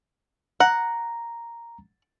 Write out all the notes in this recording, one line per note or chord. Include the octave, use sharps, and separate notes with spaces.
F#5 A#5